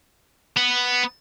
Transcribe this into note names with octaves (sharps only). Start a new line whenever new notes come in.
B3